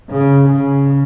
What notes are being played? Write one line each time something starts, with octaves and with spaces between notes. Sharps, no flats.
C#3
C#3